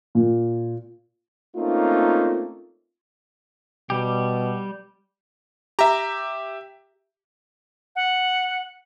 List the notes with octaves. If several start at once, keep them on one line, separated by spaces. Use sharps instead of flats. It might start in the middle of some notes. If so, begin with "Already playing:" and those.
A#2
A3 A#3 C4 C#4 D#4 F4
B2 G3 G4
G4 E5 A#5
F#5